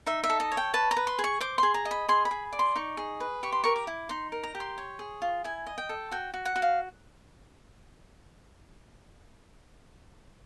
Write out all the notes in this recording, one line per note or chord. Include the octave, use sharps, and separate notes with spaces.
D#4 E5
E5
A4
D#5
C#5
G5
B4 A5
A#5
B4
C6
G#4
C#6
C5 D6
G#4 C6
A#5
D#5
B5
G#4 C6
B5
G#4
D5
C6
D#4 C#6
G#4
B4
G4 C#6
C6
A#4 C#6
D6
E4
D#4 C6
A#4
A#5
G4
C6
C#5
G#4
F4
E4 G#5
D#5
G5
A4
F#4 G5
F#4
F#5
F#4
F5